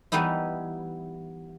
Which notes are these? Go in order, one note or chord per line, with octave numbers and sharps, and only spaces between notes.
E3 G3 B3 D#4 E4